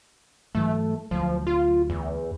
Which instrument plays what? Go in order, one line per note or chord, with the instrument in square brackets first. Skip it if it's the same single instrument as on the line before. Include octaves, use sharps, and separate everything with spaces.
[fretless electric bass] G#2 E3 F#3 [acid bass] A3
[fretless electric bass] D2 F#3 [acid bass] F3
[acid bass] F4
E2